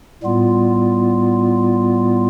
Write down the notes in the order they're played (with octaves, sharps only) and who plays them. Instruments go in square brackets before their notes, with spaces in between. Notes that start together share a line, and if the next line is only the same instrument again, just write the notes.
[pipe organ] A2 G3 B3 F4